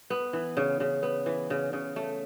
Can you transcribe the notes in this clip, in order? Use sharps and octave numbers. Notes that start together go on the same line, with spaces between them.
B3
E3
C#3
C#3
B3
E3
C#3
C#3
A3